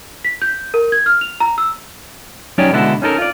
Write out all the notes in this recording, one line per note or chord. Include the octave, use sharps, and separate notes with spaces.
B6
G6
A#4
G#6
F6
F7
A#5
E6
F#3 C#4 D#4 G4 C#5 D5
B2 D3 G#3 E4 F#4 A4
C#4 D#4 A4 A#4
F4 D5